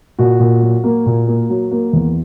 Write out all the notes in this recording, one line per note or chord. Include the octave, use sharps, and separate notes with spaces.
A#2 F#4
A#2
F#3
A#3
A#2
A#3
F#3
A#3
E2